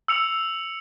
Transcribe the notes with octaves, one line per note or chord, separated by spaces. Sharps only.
E6 C#7 F7